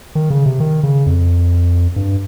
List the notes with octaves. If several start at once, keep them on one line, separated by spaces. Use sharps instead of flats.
D#3
C#3
C3
D#3
C#3
F2
G2